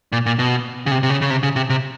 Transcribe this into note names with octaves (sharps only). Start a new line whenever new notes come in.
A#2
A#2
B2
C#3
C3
C3
C#3
C#3
C3
C#3
C3
C3